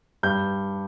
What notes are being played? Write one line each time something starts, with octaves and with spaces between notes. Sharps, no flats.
G2 G6